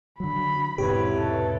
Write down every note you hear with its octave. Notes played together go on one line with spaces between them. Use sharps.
D3 F#3 B5
E1 G#2 C3 E4 G4 B4 C#5
A4